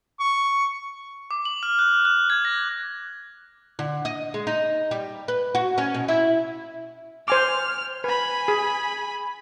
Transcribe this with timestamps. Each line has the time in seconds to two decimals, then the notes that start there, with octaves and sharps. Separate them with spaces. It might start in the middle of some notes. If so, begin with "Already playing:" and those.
0.20 C#6
1.31 D6
1.45 F#7
1.63 F6
1.79 F#6
2.05 F#6
2.30 G#6
2.45 A#6
3.79 D3
4.05 D#5
4.34 G#3
4.47 D#4
4.91 G3
5.28 B4
5.55 F#4
5.78 C#4
5.94 B2
6.08 E4
7.28 C5 G#5 D6 F6
8.04 B4 G#5 B5
8.48 G#4